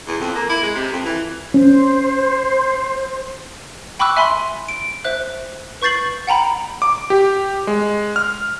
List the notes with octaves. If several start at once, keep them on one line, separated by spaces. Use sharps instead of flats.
E2
F2
A#3
E4
G#3
C3
F2
E3
C#4 C5
G5 B5 C#6 D6 E6 F#6
E5 G#5 B5 C6
D7
C5 E5 F#6
B4 C#6 G6 A6 C7 F#7
F#5 G5 A#5 B5
D6
G4
G#3
F6